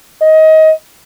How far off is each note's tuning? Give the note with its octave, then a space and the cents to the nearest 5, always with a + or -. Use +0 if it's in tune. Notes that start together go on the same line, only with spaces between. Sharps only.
D#5 +25